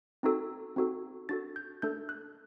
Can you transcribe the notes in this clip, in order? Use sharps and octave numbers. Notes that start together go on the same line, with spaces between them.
C4 D#4 F#4 A4
C4 D#4 F#4 A4
D4 F#4 A4 A6
G6
A3 D4 A4 G6
F#6